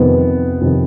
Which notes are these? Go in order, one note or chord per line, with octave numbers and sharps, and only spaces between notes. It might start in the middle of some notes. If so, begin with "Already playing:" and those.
Already playing: F2 C3 D#3 B3
F2 C3 D#3